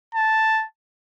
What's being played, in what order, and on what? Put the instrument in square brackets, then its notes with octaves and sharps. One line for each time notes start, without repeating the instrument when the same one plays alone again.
[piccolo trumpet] A5